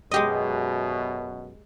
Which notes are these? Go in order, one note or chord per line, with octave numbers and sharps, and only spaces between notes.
F#2 B2 G#3 G4 D#5